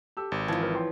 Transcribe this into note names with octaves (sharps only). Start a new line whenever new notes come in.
G4 A4 E6
G#1
E3 F3 F5 A5 G#6
A#4
C#5 G5 C6